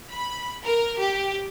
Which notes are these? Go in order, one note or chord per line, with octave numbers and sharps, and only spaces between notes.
B5
A#4
G4